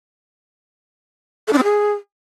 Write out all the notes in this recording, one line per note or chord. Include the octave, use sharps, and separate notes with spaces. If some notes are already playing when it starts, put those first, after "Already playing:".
A4
D4
C4
G#4